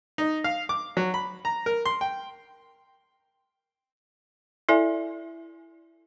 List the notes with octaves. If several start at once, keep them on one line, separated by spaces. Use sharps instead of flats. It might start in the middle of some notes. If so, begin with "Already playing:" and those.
D#4
F5
D6
F#3
B5
A#5
A#4
C6
G5
E4 A4 D5 E5 G#5